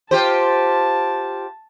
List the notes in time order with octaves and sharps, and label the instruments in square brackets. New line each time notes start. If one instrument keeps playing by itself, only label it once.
[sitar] F4 G4 C5 [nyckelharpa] A5